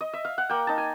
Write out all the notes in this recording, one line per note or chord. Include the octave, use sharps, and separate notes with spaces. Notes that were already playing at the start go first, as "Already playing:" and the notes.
D#5
E5
F5
F#5
A#3 G5
D#4 A5
G#5